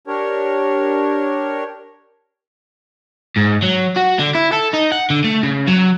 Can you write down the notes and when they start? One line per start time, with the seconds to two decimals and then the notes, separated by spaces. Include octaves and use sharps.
0.07 D4 G4 A#4 C#5
3.36 G#2
3.62 F#3
3.96 F#4
4.19 D3
4.35 E4
4.53 A4
4.74 D#4
4.92 F#5
5.10 D3
5.24 A3
5.43 C#3
5.68 F#3